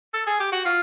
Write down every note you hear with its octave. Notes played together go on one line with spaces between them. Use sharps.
A4
G#4
G4
F#4
F4